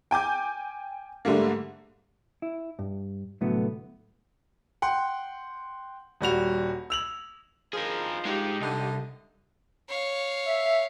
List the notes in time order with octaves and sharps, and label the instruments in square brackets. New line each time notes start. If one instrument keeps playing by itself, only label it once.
[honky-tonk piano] G5 G#5 D6 G6
G#2 D3 G3 A3 A#3
[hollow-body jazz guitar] E4
G2
C2 A2 D3 F#3 A3 B3
[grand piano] F#5 G5 C6
D#1 G3 F#4 F7
E6 F7 F#7
[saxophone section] G2 D#3 F3 [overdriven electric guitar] G#4 A#4
[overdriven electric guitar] G#3 D#4 [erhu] G4
[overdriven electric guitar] C2 [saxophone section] D3 D4 D#4
[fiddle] C#5 F5
[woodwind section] E5